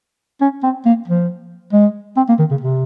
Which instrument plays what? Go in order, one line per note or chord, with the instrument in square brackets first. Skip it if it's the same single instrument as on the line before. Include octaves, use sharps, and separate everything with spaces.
[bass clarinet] C#4
C4
A#3
F3
G#3
C4
A#3
D#3
C#3
C3